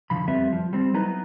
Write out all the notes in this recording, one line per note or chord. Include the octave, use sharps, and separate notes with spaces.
D2 D3 F3 B5
F2 G3 B3 C4 E5
F3
G3 C4
F#3 B3 D#4 E4 B4 A#5